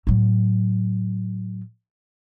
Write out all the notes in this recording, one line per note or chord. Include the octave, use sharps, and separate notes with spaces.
A2 F#3